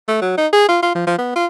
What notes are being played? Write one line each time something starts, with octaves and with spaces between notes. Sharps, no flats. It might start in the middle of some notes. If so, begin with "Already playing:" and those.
A3
F#3
D#4
G#4
F4
F4
F3
F3
B3
F4